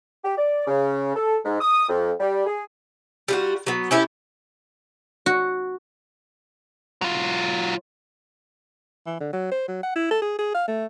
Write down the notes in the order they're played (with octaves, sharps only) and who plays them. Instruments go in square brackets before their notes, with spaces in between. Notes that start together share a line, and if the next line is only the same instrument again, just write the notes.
[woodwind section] G4
D5
C#3
A4
G#2
D#6
F2
G3
G#4
[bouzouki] G3 F4 F#4
F#3 B3
C#4 E4 G4 A4
[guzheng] F#4
[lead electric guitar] F#3 F4
[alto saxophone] E3
D3
F#3
C5
F#3
F#5
E4
A4
G#4
G#4
F5
A3